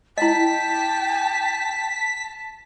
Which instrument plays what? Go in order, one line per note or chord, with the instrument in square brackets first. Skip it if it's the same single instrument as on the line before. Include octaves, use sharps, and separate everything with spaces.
[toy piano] E4 D#5 [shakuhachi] G5 [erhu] A5 [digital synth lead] B6